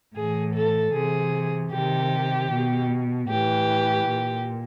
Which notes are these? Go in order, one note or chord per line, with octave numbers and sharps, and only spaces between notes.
A2 E3 G#4
A4
C3 E3 G#4
C3 D#3 G4
B2
A2 E3 G4
A#2